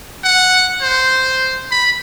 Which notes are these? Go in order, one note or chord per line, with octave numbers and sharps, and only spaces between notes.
F#5
C5
B5